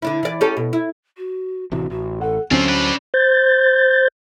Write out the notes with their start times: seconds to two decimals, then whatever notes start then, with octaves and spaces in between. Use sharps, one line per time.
0.02 D3 D4 E4
0.23 E3 D5
0.41 C#4 G4 A4
0.57 B2
0.73 E4
1.17 F#4
1.72 A1 C3 E3 F#4
1.90 A1 F#4
2.21 A4 F#5
2.51 D2 D3 F#3 C4 C#4 F4 C5
2.68 D4 B4
3.14 C5 G6 A6